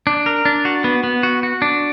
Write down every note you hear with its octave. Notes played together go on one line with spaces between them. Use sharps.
D4
A#4
D4
F#4
B3
B3
F#4
F#4
D4